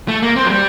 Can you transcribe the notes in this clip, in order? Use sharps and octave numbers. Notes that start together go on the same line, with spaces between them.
A3
A#3
C4
F#3
G3